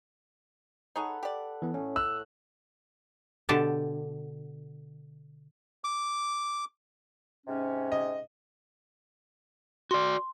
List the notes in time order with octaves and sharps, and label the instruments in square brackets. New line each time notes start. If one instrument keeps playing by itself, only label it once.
[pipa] D#4 G#4 C#5 [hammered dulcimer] A4 B4 F#5
[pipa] G4 D5
[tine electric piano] E3 B3
[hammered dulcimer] A2 [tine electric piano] C#4
[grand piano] E6 [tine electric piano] F#6
[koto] B2 D3 G4 A5
[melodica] D6
[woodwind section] G#2 C3 C#4
[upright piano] D#5
[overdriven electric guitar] F#4 D5 [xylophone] C6